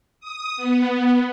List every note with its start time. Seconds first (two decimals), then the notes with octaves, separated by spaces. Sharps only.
0.20 D#6
0.57 B3